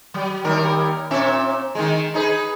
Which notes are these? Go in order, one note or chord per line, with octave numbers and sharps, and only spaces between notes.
F#3
D#2 G3 A#4
A#2 C4 E5
D#3 G#3
D#4 G#4 B4